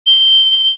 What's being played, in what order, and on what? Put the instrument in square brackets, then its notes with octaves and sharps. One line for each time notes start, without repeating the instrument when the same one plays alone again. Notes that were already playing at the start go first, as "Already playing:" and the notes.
[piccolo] G7